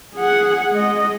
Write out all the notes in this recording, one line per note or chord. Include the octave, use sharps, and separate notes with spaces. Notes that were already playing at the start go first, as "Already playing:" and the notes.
G#4 F#5
G#3 D#5